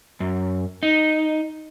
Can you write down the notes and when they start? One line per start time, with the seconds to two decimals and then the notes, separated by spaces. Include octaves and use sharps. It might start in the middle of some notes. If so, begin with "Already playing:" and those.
0.20 F#2
0.83 D#4